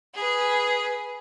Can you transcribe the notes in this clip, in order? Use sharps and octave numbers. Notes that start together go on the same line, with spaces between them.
G#4 B4